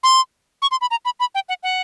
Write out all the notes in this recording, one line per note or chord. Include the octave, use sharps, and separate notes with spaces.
C6
C#6
C6
B5
A#5
B5
B5
G5
F#5
F#5